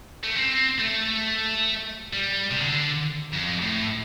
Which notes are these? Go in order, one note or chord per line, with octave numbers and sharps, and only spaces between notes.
A3
C4
A3
G3
C3
D3
F2
A2